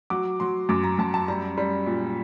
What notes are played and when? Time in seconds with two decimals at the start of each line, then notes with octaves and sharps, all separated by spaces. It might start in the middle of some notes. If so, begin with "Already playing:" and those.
0.10 F#3 D6
0.40 F#3 C6
0.69 F#2 D6
0.84 A#5
0.98 F#2 A5
1.14 A5
1.28 G3 A#5
1.58 G3
1.86 A#2